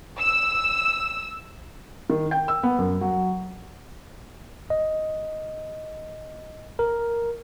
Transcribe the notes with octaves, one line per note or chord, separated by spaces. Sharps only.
E6
D#3
G5
E6
B3
F#2
F#3
D#5
A#4